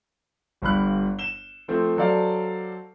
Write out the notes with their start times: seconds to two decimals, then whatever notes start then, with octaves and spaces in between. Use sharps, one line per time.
0.62 G1 G2 B5 F#6
1.19 E7 G7
1.68 F3 A3 C4
1.97 F#3 A4 C5 D5 F5